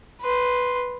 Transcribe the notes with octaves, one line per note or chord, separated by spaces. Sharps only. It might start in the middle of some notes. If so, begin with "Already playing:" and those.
B4 C6